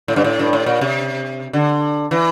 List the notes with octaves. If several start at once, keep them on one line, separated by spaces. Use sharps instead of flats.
A2
G2
A2
G2
A2
A#2
C3
D3
E3